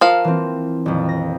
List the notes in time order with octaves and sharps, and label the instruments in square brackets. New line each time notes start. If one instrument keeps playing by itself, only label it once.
[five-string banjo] F3 F5 [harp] A#4
[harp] E3 A#3 C4
D#1 F2
A#6